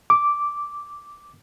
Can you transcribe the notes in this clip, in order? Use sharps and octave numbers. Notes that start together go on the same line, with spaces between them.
D6